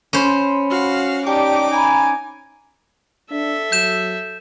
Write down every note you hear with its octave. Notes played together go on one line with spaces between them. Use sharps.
C#4 C5 B5 C6
F#4 F5
D#4 G4 D5 G5 A5 D6
G#5 A#5 B5
D4 A4 E5
F#3 G6 E7